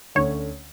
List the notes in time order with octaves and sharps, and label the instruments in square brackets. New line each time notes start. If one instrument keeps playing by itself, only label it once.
[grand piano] D2 D3 A3 C#4 [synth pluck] C#5